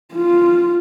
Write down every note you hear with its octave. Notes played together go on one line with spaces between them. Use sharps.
F4